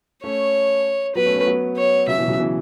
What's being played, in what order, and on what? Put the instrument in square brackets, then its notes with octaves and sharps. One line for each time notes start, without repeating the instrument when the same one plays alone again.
[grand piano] A3 C#4 [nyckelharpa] C#5
[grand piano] F#3 B3 [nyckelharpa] B4
[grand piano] A3 C#4
A3 C#4
F#3 B3
[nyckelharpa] C#5
[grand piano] C#3 F#3 [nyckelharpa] E5
[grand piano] B2 E3
C#3 F#3
B2 E3